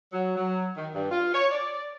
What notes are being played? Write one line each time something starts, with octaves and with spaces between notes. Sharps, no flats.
F#3
F#3
D#3
G2
F4
C#5
D5